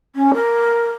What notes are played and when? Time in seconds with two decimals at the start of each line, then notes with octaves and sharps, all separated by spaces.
0.16 C#4
0.34 A#4